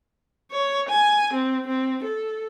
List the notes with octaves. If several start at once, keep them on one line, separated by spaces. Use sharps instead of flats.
C#5
G#5
C4
C4
A4